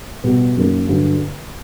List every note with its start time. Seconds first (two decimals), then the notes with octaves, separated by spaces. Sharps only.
0.24 B2 G3 B3
0.56 F#2 D#3 F#3 A#3
0.88 G2 D3 F#3